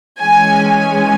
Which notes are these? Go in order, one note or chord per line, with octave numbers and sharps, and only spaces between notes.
E3 G#3 C#4 G#5
G#5